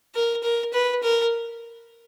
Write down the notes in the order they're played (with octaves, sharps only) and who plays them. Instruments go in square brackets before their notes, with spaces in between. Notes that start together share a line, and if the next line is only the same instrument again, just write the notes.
[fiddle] A#4
A#4
B4
A#4